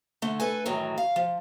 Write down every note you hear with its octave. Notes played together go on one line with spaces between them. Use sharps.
D3 A3
A4 B4 G#5
F#2 A2 D#3 E3 F#3
F5
F3